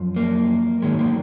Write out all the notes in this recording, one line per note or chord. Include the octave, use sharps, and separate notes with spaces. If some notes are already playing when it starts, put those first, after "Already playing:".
Already playing: F#2 F3
A#3
G#2 D#3 F#3 G#3
A#3